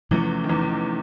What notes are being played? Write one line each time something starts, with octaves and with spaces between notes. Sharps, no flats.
E2 C3 E3 F3 A3 C#4
D#3
E2 E3